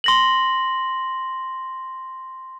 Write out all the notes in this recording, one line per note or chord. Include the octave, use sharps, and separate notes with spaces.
C6 A#6 F#7